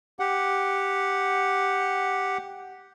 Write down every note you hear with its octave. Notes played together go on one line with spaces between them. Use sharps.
G4 F#5